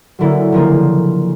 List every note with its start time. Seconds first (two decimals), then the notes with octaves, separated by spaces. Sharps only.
0.19 D3 F#3 A#3 C#4 E4
0.52 C#3 F3 A#3 D4